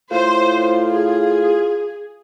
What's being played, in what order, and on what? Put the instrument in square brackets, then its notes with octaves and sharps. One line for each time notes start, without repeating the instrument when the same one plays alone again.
[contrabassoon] A2 [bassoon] F4 [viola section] C5
[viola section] G#4